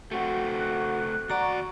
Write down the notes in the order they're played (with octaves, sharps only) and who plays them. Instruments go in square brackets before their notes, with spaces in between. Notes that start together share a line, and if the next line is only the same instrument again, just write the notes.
[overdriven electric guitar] A3 C4 [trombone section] F#4
[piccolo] F#6
[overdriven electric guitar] D#2 D5 [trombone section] F#4 [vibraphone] A#5